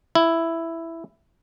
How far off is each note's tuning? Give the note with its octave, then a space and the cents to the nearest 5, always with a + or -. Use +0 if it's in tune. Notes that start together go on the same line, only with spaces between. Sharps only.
E4 +5